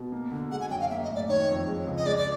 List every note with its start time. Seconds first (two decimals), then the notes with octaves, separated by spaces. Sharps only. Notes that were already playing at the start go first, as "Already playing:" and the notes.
Already playing: B2
0.12 A#3
0.31 D3
0.51 G#3 F#5
0.61 G#5
0.70 F#2 G5
0.80 F5
0.90 A#3 E5
1.03 D#5
1.09 A2
1.15 D5
1.29 D#3 C#5
1.48 F2
1.67 G#3
1.87 C#2
1.97 D#5
2.06 G#3 D5
2.18 D5